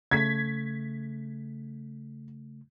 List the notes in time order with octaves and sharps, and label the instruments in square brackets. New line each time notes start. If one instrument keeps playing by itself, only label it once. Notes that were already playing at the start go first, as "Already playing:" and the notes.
[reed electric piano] C#3 A3 [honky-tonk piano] G#6 B6